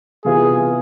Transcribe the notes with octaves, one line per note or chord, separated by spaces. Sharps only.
C3 E3 B3 F4 G#4